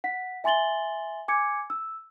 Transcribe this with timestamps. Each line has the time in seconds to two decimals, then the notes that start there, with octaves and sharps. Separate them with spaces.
0.04 F#5 B6
0.44 E5 G#5 C6 A6 F#7 G7
1.28 G#5 D6 G#6 C#7
1.70 E6